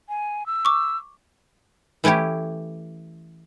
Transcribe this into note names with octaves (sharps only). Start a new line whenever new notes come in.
G#5
E6
C#6 D6
E3 A3 C#4 E4 G4